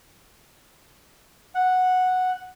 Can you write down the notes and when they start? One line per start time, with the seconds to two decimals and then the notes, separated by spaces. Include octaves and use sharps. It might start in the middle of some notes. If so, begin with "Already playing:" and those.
1.55 F#5